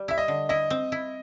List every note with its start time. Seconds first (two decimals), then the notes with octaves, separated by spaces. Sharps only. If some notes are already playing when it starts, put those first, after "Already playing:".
Already playing: G3
0.08 E4 E5
0.18 D#5
0.28 D3
0.49 E4 D#5
0.70 C4
0.92 E4